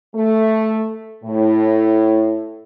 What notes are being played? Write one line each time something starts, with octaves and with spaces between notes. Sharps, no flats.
A3
A2